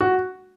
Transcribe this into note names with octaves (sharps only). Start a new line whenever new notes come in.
F#4